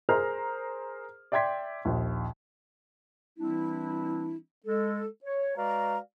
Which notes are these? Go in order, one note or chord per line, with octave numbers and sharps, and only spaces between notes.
G#4 A#4 C5 A#5 F6
D5 E5 G5 C6 G#6 B6
A#1 D#2
E3 G3 C4 D4 E4
G#3 A4
C#5
G#3 F#4 B4 D5 F5 A#5